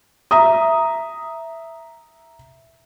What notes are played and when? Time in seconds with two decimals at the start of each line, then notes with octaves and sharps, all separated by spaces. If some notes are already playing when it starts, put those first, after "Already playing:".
0.31 E5 A#5 D#6